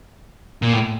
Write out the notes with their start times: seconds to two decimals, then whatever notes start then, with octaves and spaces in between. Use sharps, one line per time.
0.62 A#2
0.73 A2